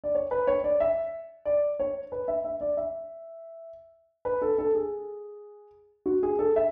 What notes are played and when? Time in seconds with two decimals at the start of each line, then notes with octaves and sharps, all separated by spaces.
0.04 D5
0.15 C#5
0.31 B4
0.47 C#5
0.64 D5
0.80 E5
1.45 D5
1.79 C#5
2.12 B4
2.28 E5
2.45 E5
2.61 D5
2.77 E5
4.25 B4
4.42 A4
4.58 A4
4.75 G#4
6.06 F#4
6.23 G#4
6.39 A4
6.56 E5